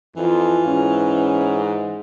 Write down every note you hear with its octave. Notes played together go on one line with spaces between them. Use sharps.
F2 E3 F4
G#2 C#4